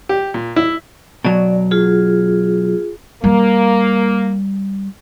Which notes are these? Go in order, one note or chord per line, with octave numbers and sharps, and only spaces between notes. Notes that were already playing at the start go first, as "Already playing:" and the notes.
G4
A#2
E4
B2 F#3 D5
F4 G#4
G3 A#3